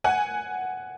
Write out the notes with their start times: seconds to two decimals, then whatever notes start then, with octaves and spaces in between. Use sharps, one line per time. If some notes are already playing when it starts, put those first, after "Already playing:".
0.04 F#5 G#5